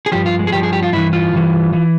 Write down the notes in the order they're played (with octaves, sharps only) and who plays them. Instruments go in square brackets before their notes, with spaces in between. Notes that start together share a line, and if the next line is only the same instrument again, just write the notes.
[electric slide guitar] G#4
G2 F3 G4
F4
G#3
G#4
G2 F3 G4
G#4
G4
F4
G2 E3 E4
F4
G2 E3
E3